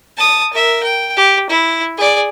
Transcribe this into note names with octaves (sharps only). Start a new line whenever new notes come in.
A5 D#6
A#4 E5
G5
G4
E4
G#4 D5